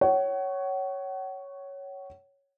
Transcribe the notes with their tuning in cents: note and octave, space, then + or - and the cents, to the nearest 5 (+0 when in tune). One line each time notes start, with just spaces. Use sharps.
C#5 +0 F#5 +35